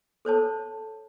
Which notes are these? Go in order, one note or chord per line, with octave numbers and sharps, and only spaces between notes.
A4 C5 C#5 A5